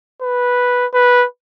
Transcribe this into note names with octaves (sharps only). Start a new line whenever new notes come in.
B4
B4